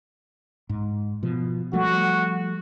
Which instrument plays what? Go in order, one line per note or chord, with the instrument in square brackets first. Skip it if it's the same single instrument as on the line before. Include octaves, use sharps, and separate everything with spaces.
[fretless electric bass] G#2
B2 F3
[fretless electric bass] F3 G3 A3 [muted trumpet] F#4